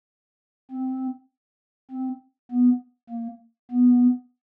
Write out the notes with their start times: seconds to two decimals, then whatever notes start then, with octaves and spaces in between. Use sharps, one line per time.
0.71 C4
1.91 C4
2.51 B3
3.10 A#3
3.71 B3